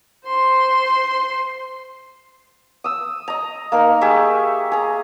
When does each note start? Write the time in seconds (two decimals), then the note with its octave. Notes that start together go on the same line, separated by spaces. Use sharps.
0.26 C5 C6
2.84 D#6 E6
3.28 D#5 A#5
3.72 A#3 D#4 A#4
4.01 G4 G#4 E5 C#6
4.72 G#4 A#5